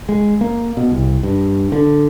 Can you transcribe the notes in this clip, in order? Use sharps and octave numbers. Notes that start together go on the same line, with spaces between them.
G#3
A#3
B2
C2
G2
D3